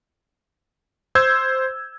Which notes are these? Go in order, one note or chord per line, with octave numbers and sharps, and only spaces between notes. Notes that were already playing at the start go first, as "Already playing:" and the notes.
C5 E6 G6 G#6